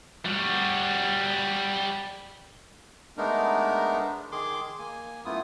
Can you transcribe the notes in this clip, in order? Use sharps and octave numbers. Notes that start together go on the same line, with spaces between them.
G3 F#4
G#3 A3 B3 D4 D#4 A#4
D#3 G#4 C6 D6
A#3 G#5
F#2 A3 B3 E4 F4 D#6